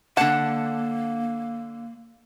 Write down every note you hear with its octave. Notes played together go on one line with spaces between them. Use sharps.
D3 A#3 F#5 A5